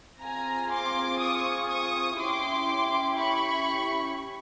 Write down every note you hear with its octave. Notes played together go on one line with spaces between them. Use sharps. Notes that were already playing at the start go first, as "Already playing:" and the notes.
C4 F4 G#4 G#5 A#5
C6 D6
C#6 D#6
C#6 D#6
C#4 E4 G4 C6 D6
B5 C#6